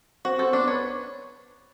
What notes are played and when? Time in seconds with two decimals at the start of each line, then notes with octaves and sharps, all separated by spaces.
0.25 C4 F#4 C5
0.39 C4 A4 C5
0.53 B3 D4 B4
0.68 B4 C#5